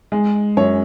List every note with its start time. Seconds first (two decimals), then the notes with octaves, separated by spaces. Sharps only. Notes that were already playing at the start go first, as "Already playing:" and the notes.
0.12 G#3
0.57 F#2 C#5